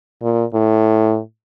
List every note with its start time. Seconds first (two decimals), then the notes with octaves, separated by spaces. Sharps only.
0.22 A#2
0.54 A2